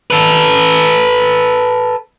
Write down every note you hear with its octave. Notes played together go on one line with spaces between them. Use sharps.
A4 B4